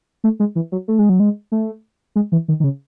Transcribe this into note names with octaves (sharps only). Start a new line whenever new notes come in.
A3
G#3
E3
F#3
A3
G#3
F#3
G#3
A3
G#3
E3
D#3
D#3
C#3